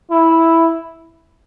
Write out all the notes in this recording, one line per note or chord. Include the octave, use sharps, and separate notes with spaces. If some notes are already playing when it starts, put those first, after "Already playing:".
E4